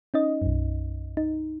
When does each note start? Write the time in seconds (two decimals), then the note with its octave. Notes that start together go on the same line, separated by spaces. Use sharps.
0.14 C#4 D#4 D#5
0.42 B1 F#2
1.17 D#4